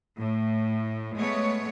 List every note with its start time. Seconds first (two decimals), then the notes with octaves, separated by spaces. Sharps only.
0.18 A2
1.17 G#3 A3 B3 C#5